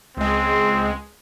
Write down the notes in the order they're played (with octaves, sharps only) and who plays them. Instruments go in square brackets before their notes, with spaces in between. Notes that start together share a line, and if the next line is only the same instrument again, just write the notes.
[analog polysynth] C#2 G#3 [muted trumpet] C4